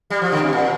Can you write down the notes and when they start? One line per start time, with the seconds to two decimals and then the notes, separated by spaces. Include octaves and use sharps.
0.10 G3
0.22 F3
0.32 D3
0.42 C3
0.53 A#2